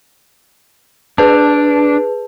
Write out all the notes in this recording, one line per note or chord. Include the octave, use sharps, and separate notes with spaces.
D4 G#4 B4 A5